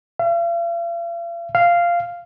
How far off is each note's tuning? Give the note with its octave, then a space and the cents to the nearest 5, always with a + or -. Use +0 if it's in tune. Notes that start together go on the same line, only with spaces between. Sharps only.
F5 -45
F5 -10